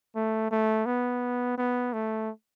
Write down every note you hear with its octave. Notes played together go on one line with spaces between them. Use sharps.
A3
A3
B3
B3
A3